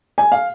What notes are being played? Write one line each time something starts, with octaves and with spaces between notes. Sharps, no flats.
G#5
F5